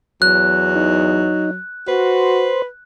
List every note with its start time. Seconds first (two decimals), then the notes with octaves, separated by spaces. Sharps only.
0.22 E2 F#3 F#6
0.76 D#4
1.88 F#4 B4 C5